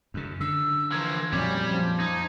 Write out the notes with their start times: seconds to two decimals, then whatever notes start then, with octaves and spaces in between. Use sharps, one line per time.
0.14 F#2 C#3
0.41 D3 E6
0.92 E3 F3 A#3 G#6
1.32 F2 A#2 F#3 G3 C#4 G4
1.67 F3 G#6
2.00 D#4